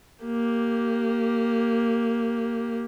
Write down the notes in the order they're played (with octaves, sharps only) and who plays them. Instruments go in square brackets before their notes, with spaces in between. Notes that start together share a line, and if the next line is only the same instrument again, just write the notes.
[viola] A#3 G4